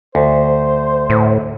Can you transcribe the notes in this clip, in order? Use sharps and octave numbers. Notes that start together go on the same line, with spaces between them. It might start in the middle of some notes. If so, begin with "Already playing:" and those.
D2 C5
A2